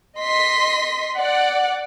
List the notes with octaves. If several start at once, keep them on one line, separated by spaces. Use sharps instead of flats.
D#5 C6 B6
D5 F#5